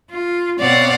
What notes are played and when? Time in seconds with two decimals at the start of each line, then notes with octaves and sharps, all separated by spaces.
0.11 F4
0.60 B2 C4 C#5 D5 F5 F#5